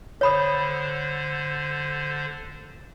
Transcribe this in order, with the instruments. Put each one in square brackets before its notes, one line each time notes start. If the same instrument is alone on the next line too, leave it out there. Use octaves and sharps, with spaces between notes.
[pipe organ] D3 C5 [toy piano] C#5 B5 D#6